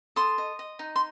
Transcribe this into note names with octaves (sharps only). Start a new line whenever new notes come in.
A4 C6 D#6
D#5
D#5
D#4
C6